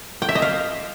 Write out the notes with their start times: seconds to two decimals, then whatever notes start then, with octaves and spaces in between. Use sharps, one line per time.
0.22 G5
0.29 E5
0.35 D#5
0.42 F5